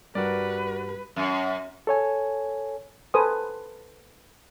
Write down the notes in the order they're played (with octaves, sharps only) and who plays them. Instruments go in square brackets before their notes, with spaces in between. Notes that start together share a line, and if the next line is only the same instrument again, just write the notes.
[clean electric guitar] G2 G3 [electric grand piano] F#4 A#4 D5 [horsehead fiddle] B4
[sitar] F#2
[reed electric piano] A4 C#5 G#5
[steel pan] A4 B4 C5 G#5 D#6